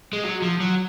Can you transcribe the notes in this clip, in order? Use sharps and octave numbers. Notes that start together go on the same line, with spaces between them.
G#3
F#3
F3
F#3